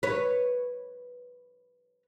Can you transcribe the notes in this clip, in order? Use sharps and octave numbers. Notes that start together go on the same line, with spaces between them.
B4 C#5